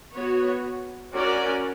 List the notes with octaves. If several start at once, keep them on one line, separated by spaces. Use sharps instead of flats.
B3 F#4 C#5
C#4 F#4 A#4 D5